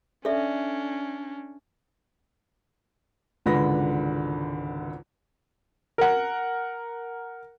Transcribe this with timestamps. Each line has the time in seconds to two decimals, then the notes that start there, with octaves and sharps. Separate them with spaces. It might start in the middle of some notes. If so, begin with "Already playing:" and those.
0.25 C#4 D4 A4 D5 E5
3.46 G#1 C#2 D3 B4 B5 A#6
5.98 A#4 F#5